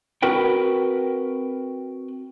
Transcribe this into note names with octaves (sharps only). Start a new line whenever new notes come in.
C4 F#4 A#4 B4 G5